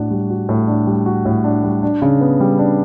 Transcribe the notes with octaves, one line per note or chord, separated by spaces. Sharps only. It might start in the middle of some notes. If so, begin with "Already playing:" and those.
Already playing: A2 D4 F#4
G3
F#4
A2
D4
G3
F#4
A2
D4
G3
D4
C#3
B3
G3
D4